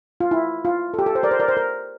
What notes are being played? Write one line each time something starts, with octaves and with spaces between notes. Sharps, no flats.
F4
E4
F4
A4
G4
A4
C5
A#4 D5
C5
A#4 D5
C5
A#4